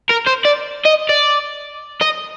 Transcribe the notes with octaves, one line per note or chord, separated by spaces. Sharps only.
A#4
C5
D5
D#5
D5
D#5